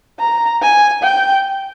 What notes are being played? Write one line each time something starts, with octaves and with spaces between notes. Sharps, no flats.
A#5
G#5
G5